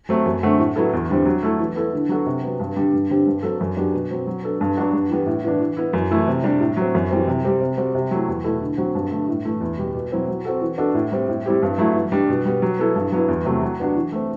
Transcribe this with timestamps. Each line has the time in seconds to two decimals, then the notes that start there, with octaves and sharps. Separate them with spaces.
0.09 F#3 A3 C4
0.26 F#2
0.43 D3 A3 C4 F#4
0.59 A2
0.76 F#3 B3 E4 A4
0.93 E2
1.10 D3 G3 C4
1.25 F#3
1.43 A3 E4 A4
1.59 E3
1.76 B3 E4 A4
1.93 D3
2.09 F#3 B3 F#4 A4
2.26 C3
2.43 F#3 B3
2.59 G2
2.76 D3 G3 D4
2.93 G2
3.10 D3 G3 C4 G4
3.27 G2
3.43 F#3 C4 F#4 A4
3.60 F#2
3.76 F#3 B3 D4 G4
3.94 B2
4.11 F#3 C4
4.27 F#3
4.43 B3 D4 A4
4.61 G2
4.77 F#3 B3 D4 F#4
4.93 G2
5.10 E3 G3 B3
5.26 A2
5.44 E3 B3 D4
5.60 E3
5.77 B3 E4
5.93 F#2
6.11 E3 A3 E4
6.28 C3
6.43 G3 D4 G4
6.60 A2
6.77 F#3 C4
6.95 F#2
7.11 E3 G3 C4
7.27 C3
7.44 G3 C4 G4
7.61 C3
7.77 G3 C4 F#4
7.95 C3
8.11 F#3 A3 E4
8.28 E2
8.44 B2 A3 E4 A4
8.61 D3
8.77 F#3 C4 F#4
8.95 G2
9.11 D3 A3
9.28 A2
9.45 E3 A3
9.61 E2
9.77 B2 G3
9.94 B2
10.12 F#3 C4 E4
10.28 F#3
10.45 C4 F#4 A4
10.61 E3
10.78 B3 D4 F#4 A4
10.94 A2
11.12 G3 C4
11.29 A2
11.46 G3 C4 E4 G4
11.62 G2
11.78 F#3 A3 E4
11.95 E3
12.12 G3 D4
12.29 B2
12.45 G3 B3
12.62 F#3
12.79 B3 E4 A4
12.96 G2
13.12 F#3 B3 E4
13.28 E2
13.45 C3 F#3 A3
13.62 F#3
13.80 B3 D4 F#4
13.96 E3
14.12 A3 C4